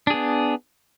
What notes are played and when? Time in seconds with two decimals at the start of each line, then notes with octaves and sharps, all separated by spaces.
0.07 D4
0.10 G#4
0.14 B3